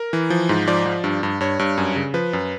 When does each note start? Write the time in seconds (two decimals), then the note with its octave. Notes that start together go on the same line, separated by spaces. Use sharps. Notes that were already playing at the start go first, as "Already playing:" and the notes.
Already playing: A#4
0.13 E3
0.30 F3
0.49 G#2
0.67 F3 D5
0.86 F3
1.04 G2
1.23 G2
1.41 G2 C#5
1.59 G2
1.78 F#2
1.96 C#3
2.14 F3 B4
2.33 F#2